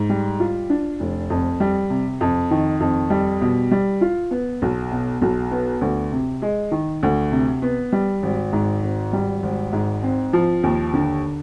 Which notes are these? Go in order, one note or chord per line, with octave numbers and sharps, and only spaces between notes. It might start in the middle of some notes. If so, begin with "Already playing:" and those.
Already playing: G#2
G3
F4
D4
F1
F2
G3
C3
F2
D#3
F2
G3
B2
G3
F4
B3
B1
B2
B1
B3
D2
C3
G#3
D#3
D2
C3
B3
G3
G#1
G#2
G#1
G3
G#1
G#2
C4
F3
D#2
D3